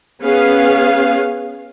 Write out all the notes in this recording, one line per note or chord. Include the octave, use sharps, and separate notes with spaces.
B3 C#4 G#4 F5